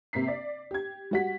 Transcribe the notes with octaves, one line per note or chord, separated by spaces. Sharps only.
C3 A#3 B6 C7
D5
G4 G#6
G3 F#4 B6